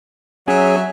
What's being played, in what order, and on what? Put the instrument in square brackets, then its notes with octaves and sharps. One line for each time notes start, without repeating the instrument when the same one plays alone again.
[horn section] F#3 E5 [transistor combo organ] C#4 G#4